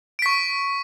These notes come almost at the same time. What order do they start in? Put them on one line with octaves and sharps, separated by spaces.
D7 B6 C#6